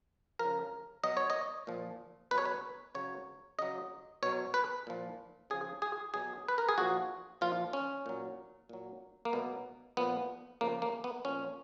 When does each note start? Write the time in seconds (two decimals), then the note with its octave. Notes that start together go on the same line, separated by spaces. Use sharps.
0.39 C#3 F3 A#4
1.03 B2 F#3 D#5
1.17 C#5
1.30 D#5
1.67 A#2 F3
2.31 B2 B4
2.34 F#3 C#5
2.46 B4
2.95 C#3 F#3 C#5
3.58 C#3 F#3 D#5
4.23 B2 F#3 C#5
4.54 B4
4.87 A#2 F3
5.50 C#3 F3 G#4
5.82 G#4
6.14 B2 F#3 G#4
6.48 B4
6.58 A#4
6.69 G#4
6.78 A#2 F3 F#4
7.41 A#2 F3 F4
7.73 C#4
8.06 A#2 F#3
8.69 A#2 F#3
9.25 A#3
9.33 B2 F#3 B3
9.97 A#2 F3 B3
10.61 C#3 F3 A#3
10.82 A#3
11.04 B3
11.25 A#2 F3 C#4